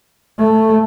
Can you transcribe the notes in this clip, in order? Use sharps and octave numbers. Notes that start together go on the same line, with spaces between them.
A3